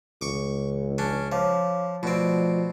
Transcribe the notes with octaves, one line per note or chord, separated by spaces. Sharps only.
C#2 C#6 D6
C#4 D4
F3 C#5 F5 D6
B2 F3 A3 C4 D5 D7